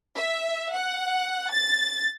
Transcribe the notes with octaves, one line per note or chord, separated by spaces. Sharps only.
E5
F#5
A6